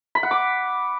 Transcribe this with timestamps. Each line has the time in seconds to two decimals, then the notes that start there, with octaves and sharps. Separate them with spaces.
0.15 B5
0.23 F#5
0.31 D6